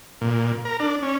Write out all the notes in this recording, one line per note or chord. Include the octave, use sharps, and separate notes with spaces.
A#2
A#4
D4
C#4